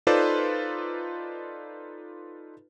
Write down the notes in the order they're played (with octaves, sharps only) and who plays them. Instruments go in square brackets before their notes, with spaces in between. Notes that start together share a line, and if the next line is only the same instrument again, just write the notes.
[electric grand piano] D#4 F4 A4 B4 C5 D5